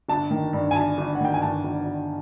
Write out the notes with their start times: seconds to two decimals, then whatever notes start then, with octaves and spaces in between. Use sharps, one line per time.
0.09 G1 A5
0.31 D#3
0.53 G2
0.71 G#5
0.75 G1 A5
0.98 G1
1.15 F#5
1.21 D#3 G5
1.34 G#5
1.42 G2 A5
1.64 G1
1.87 G1